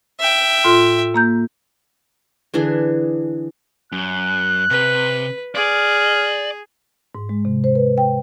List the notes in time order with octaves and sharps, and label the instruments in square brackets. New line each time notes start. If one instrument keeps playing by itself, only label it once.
[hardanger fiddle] E5 G5
[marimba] A2 F4 C6
A#3 A#5 G6
[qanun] D3 E3 D4 G#4
[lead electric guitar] F#2 [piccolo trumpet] F#6
[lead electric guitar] C3 [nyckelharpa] B4
[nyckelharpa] G#4 [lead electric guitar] D5 [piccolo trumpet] F6
[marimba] G#2
G#3
C3
C5
B4
G5